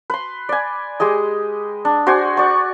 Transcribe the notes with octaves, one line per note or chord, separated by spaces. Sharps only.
B4 C6
D5 G#5
G#3 G4 G#4 D#5
D4
F#4 C5 D5 G#5
D5 C#6